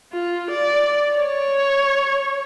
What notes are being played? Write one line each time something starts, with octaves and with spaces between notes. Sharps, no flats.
F4
D5
C#5